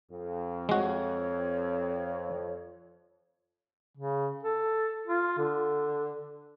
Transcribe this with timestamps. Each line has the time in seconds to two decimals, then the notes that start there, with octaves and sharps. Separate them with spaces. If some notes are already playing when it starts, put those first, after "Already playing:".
0.11 F2
0.69 G#3 F#4 C#5
3.97 C#3
4.43 A4
5.08 F4
5.38 D3